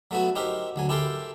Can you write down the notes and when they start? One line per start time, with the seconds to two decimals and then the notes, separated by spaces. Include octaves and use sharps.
0.11 F#3 A3 B3 E4 F#4
0.35 D#4 G4 A#4 C5 E5
0.76 D2 F#3 G#5
0.89 E4 G4 A4 A#4 G5 C6